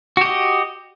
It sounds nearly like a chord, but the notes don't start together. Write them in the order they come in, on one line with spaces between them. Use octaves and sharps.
F#4 G4 D#5